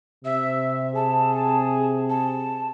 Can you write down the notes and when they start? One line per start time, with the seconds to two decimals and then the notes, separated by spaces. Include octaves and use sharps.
0.24 C3 E5
0.95 G#4 A5
2.09 A5